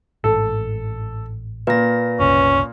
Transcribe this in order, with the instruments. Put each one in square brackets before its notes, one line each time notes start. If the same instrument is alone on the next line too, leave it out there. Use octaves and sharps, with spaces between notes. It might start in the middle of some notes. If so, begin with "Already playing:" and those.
[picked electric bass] A1 G#2 [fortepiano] A4
[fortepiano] A#2 [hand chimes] B4 A#6
[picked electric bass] F#1 C2 [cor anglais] C#4